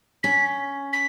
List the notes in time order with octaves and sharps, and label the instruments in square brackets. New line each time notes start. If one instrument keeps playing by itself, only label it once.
[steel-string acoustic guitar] C#4 [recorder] B6
[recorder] B6